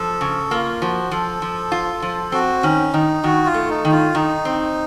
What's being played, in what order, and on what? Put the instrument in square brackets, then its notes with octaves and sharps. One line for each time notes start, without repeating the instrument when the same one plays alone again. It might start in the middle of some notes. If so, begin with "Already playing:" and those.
Already playing: [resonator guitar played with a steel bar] F3 [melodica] A4
[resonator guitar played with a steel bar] C#3
[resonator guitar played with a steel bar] A#3 [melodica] F4
[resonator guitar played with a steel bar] F3 [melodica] F#4
[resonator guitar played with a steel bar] F3 [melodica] A4
[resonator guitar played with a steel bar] F3
F4
F3
[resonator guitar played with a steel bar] C4 [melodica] F#4
[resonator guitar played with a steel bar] D#3 [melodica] C#4
[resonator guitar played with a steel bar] D#3 [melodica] D#4
[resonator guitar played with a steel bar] D#3 [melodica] F#4
[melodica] F4
[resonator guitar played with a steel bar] A3
[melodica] D#4
[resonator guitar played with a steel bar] D#3
[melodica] F4
[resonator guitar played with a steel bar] D#3 [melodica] D#4
[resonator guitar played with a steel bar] C4